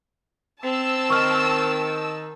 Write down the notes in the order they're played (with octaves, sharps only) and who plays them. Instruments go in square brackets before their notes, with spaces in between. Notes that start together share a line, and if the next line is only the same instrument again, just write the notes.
[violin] C4 [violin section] A5 E6
[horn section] D#3 [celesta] C#6 F6